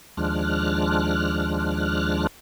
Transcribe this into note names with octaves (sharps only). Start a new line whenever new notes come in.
D#2 F3 G#3 D4 F6 F#6